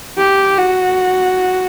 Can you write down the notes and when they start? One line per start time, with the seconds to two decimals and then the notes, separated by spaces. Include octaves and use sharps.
0.18 G4
0.57 F#4